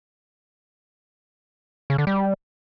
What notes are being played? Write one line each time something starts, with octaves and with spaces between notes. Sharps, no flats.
C#3
D3
G3